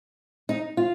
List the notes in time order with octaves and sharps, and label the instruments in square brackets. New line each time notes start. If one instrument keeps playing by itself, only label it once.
[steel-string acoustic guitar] D#4
F4